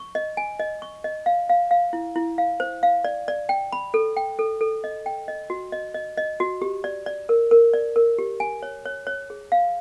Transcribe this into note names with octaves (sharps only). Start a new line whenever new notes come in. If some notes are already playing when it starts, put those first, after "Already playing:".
Already playing: C#6
D#5
G#5
D#5
C#6
D#5
F5
F5
F5
E4
E4
F5
C5
F5
D5
D5
G5
B5
A4
G5
A4
A4
D#5
G5
D#5
F#4
D#5
D#5
D#5
F#4
G4
D5
D5
A#4
A#4
D5
A#4
G4
G#5
C#5
C#5
C#5
G#4
F5